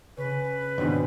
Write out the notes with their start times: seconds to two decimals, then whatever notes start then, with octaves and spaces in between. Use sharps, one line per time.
0.17 C#3 B4
0.78 G#1 C#2 B2 C4 D4